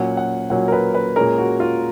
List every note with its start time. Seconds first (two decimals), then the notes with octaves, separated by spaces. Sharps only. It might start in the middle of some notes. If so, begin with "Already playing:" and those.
Already playing: A#2 F#3 C#4 F#5
0.17 F#5
0.50 A#2 F#3 C#4 F#5
0.68 A#4
0.72 B4
0.94 B4
1.16 A#2 G#3 C#4 A#4
1.38 F#4
1.60 F4